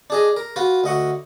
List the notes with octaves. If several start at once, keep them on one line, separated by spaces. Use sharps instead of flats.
D4 G#4 D#5
A#4
F4 F#4 B4
D2 D#5 F#5 C#6